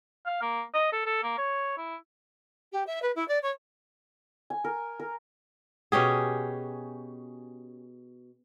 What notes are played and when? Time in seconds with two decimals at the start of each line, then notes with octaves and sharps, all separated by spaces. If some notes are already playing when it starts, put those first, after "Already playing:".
0.26 F5
0.42 A#3
0.74 D#5
0.93 A4
1.06 A4
1.23 A#3
1.38 C#5
1.78 E4
2.72 G4
2.87 E5
3.02 B4
3.15 E4
3.28 D5
3.42 C#5
4.50 G#5
4.64 A#4
5.00 A#4
5.92 B2 C#4 G4 G#4